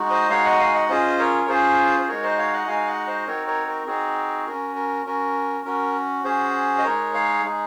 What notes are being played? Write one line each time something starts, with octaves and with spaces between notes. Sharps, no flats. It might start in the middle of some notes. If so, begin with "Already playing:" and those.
Already playing: G#3 D#4 F#4
C5 D#5
G#3 D#4 F#4 C#5 F5
D#5 F#5
F5 G#5
D#5 F#5
C#4 F4 G#4 C5 D#5
A#4 C#5
C#5
C#4 F4 G#4 C5
C5
G#3 D#4 F#4 A#4 C#5
C5 D#5
C#5 F5
D#5 F#5
G#3 D#4 F#4 F5 G#5
D#5 F#5
C5 D#5
C4 D#4 F#4 A#4 C#5
A#4 C#5
A#4
C4 D#4 F#4 G#4
C#4 F#4 A#4
A#4
C#4 F#4 A#4
C#4 F#4 A#4
C#4 F#4 G#4 C5
D#5
G#3 D#4 G#4 A#4 C#5
C#5 F5
G#3 D#4 G#4